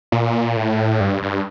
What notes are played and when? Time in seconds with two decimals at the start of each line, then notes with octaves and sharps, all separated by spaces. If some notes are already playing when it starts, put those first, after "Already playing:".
0.12 A#2
0.56 A2
1.00 G2
1.23 G2